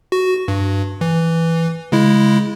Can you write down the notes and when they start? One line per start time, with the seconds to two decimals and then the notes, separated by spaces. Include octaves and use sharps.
0.12 F#4
0.48 G2
1.01 E3
1.92 C#3 G#3 E4